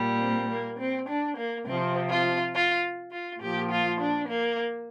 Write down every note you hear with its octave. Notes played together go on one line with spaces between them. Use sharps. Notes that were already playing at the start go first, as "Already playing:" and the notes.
Already playing: A#2 G3
C4
A#3
C4
D4
A#3
C3 F3 C4
F4
F4
F4
A#2 F3 G4
F4
D4
A#3